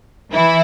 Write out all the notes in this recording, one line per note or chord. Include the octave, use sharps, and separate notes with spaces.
E3 E4